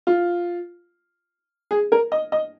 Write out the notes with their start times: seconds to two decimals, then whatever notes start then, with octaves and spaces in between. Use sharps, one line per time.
0.07 F4
1.71 G#4
1.92 A#4
2.12 D#5
2.32 D#5